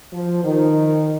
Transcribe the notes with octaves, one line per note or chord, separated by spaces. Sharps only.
F3
D#3